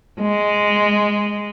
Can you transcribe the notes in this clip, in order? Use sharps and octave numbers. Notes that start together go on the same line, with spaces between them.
G#3